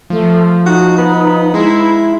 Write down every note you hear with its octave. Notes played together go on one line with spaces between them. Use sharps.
F3 A3
D#4 F#4
B3
G#3 E4